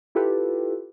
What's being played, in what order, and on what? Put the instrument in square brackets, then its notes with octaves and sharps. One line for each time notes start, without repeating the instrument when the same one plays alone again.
[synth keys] E4 F4 G4 A4 B4